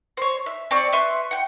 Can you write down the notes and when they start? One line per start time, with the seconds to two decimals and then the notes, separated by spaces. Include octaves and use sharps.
0.17 C5 C#5
0.46 E5
0.71 C4 D5 C#6
0.92 B4 E5 C6 C#6
1.31 F#5 G5